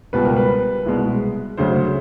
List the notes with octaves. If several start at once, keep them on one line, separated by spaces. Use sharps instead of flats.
C#2 B2 G3 B4
A#4
B4
C2 B2 G#3
D2 C#3 F#3 C5